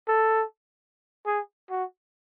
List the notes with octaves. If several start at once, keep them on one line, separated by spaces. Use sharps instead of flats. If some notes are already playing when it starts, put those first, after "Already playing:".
A4
G#4
F#4